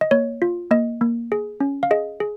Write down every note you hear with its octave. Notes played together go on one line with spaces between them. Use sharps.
D#5
A#3 C#5
F4
A#3 D#5
A#3
G#4
C#4
F5
G#4 D#5
G#4